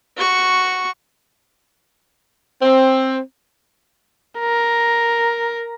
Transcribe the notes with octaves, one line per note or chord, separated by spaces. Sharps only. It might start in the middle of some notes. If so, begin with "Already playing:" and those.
F#4 C#6
C4
A#4